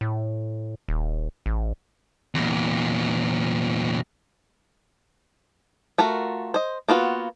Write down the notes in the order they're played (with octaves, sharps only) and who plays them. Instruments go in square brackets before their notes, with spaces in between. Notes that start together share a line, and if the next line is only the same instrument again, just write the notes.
[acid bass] A2
D#1
A1
[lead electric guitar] E2 A#2
[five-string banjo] A3 F4 F#4 A#4
C5 D#5
A#3 B3 F4 F#4